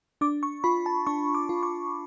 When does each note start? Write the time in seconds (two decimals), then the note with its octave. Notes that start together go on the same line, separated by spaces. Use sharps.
0.21 D4 D6
0.43 C#6
0.64 F4 B5
0.86 A5
1.07 D4 C#6
1.35 D6
1.49 F4
1.63 C#6